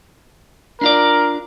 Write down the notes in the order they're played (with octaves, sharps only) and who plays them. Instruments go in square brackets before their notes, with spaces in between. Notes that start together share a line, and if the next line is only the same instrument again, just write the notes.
[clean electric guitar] D4 F4 D5 [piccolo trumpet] A#4